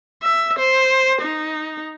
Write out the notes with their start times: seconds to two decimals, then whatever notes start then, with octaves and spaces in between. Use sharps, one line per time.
0.22 E5
0.59 C5
1.21 D#4